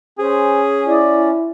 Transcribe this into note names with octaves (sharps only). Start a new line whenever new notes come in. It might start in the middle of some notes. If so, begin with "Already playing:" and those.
C#4 G#4 C5
E4 D5